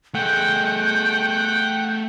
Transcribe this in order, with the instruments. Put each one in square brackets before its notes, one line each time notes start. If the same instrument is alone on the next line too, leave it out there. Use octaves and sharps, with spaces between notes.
[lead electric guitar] A3 G#4 [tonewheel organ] F#5 G5 [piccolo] G6